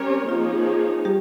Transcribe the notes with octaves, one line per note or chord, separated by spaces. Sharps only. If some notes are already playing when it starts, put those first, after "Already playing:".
Already playing: G3 C#4 G4 A#4 C#5
C4 C5
F3 A#3 D#4 F4 G#4 C#5
G3 G4